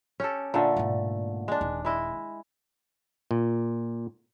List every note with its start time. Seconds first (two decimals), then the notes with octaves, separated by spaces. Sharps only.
0.20 C#4 G4 A4
0.54 A#2 D3 A3
0.76 G#2 B2
1.48 G#3 D4
1.61 D#1
1.85 G#3 E4 D#5
3.31 A#2